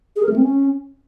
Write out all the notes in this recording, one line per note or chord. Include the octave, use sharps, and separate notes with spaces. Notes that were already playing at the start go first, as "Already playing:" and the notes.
G#4
A#4
A3
C4
C#4